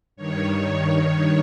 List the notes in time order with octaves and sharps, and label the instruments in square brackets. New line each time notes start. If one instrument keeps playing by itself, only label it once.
[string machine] G2 D#3 C#5